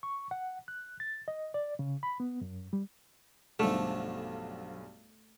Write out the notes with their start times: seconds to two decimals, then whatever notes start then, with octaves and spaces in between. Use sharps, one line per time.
0.03 C#6
0.31 F#5
0.68 F#6
1.00 A6
1.28 D#5
1.54 D5
1.79 C#3
2.03 B5
2.20 B3
2.41 F#2
2.73 G3
3.59 B1 G2 D3 F3 A3